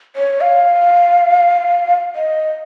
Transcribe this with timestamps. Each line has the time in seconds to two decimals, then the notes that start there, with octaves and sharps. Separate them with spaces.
0.16 C#5
0.41 F5
2.15 D#5